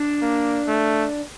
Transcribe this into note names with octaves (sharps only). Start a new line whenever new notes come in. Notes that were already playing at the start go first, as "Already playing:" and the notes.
Already playing: D4
A#3
A3